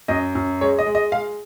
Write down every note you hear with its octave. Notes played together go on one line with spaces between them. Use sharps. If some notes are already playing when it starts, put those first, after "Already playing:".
F#2 D#5
F#2
G#3 C#5
D#5
G#3
D#5
G#3 F5